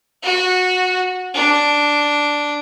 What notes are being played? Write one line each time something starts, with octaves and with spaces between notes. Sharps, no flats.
F#4
D4